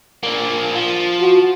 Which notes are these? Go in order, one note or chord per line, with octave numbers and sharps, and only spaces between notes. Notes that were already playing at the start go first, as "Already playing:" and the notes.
A#3 D4
F3
F#4